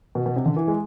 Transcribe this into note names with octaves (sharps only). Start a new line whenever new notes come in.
B2
B2
C3
D3
E3
G#3